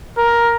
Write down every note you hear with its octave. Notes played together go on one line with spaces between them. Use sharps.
A#4